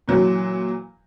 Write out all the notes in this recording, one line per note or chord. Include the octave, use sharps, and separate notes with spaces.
A#2 E3 F#3